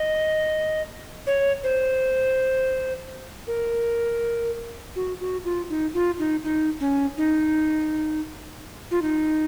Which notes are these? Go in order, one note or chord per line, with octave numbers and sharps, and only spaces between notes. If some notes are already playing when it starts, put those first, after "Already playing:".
Already playing: D#5
C#5
C5
A#4
F#4
F#4
F4
D#4
F4
D#4
D#4
C#4
D#4
F4
D#4